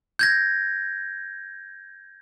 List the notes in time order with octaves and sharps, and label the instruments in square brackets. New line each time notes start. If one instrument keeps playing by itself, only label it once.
[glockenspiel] G6 G#6 A#6